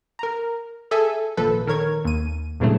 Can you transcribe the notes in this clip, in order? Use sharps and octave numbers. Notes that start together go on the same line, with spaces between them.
A#4 A#5
G#4 A4 E5 G#5
G#1 A#2 F3 A4 B4
D#3 A#4 C#5 G#6
D#2 D#7
G2 A#2 C#3 E3 F#3 A3